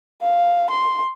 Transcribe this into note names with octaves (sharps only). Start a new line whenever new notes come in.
F5
C6